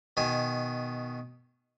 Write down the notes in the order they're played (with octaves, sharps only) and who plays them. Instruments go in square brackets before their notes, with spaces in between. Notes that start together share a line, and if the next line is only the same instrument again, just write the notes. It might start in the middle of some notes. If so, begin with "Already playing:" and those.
[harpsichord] B2 D#3 G#5